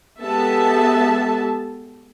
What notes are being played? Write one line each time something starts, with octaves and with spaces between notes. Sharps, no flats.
G#3 B3 G4 A4 E5 A5